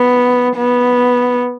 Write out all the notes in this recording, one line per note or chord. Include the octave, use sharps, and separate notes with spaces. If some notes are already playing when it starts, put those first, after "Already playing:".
Already playing: B3
B3